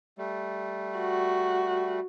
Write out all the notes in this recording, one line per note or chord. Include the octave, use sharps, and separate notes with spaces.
G3 A3
F#4